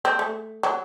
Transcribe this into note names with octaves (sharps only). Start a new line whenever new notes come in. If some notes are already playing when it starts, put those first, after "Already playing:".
C4
A3
F#3